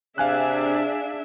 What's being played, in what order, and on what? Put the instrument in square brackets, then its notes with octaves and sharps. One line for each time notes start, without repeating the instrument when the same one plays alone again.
[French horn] C3 [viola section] D4 G#4 E5 [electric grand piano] F5 G#5 F#6